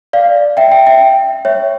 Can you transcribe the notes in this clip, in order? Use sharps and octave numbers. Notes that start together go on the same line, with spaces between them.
D5 F5
E5 G5
E5 G5
E5 G5
C#5 E5